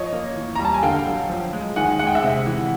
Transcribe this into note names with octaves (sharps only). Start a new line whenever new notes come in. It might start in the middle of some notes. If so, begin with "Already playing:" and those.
Already playing: F3 C#5 D#5
A#3
E3
G3 A#5
A5
G#5
D3 F5 G5
F#3
F3
G#3
D#3 F#5 G#5
G#3 F#5
G5
E5 F#5
C3
E3